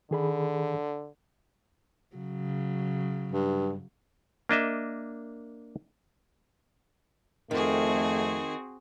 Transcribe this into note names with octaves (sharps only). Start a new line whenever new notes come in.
D3 D#3 G#4 B5
C#3 F#3
G2
A#3 D4 D#5 E5
F2 D#3 A3 C4 F#4 G#4